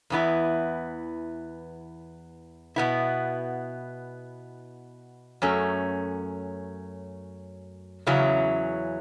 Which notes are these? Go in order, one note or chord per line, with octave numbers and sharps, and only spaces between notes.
E2 E3 B3 E4
B2 B3 E4
F#2 F#3 A3 C#4
E2 C#3 F#3 C#4 E4